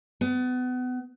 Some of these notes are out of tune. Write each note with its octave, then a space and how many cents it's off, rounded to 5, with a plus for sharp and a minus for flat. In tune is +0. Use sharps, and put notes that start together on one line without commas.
B3 +30